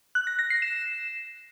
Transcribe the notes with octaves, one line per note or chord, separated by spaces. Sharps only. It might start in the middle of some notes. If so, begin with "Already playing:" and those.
F#6
A#6
A#6
C7
E7